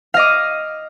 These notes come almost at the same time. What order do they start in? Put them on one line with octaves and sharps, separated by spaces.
F5 D#5 D6